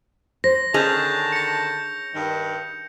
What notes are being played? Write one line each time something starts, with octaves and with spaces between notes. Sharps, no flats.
C5 A#6
D3 D#3 C#4 G#4 D#5 A5 G6 F7
A#6 C#7
G2 D#3